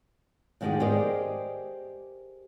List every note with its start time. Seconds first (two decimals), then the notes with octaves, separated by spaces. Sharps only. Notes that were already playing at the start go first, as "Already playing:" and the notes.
0.61 F2 G#2 D#3 C#4 G4 G#4
0.80 G4 G#4 A#4 C5 D5 D#5